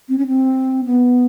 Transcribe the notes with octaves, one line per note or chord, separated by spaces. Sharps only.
C4
C#4
C4
B3